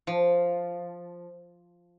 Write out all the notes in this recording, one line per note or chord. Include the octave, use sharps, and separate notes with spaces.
F3